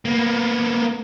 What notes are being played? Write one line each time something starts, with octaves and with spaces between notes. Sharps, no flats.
A#3 B3